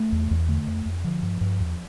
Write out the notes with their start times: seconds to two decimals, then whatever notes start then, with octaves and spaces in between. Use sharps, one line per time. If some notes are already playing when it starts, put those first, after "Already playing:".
Already playing: A3
0.12 E2
0.31 E2
0.48 D3 A3
0.67 F2
0.86 F2
1.04 D3 F3
1.22 G2
1.41 G2
1.60 E2